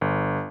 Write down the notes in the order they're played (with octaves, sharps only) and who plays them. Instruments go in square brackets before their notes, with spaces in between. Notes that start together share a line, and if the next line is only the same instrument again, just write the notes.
[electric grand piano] G1